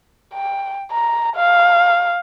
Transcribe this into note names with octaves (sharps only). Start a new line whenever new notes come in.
G5
A#5
F5